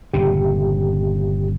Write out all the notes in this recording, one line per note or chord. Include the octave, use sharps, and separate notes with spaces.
G1 A#2 C#3 G4